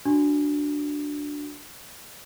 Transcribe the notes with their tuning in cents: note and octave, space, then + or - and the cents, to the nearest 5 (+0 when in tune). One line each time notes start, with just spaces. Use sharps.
D4 +0 F#4 -10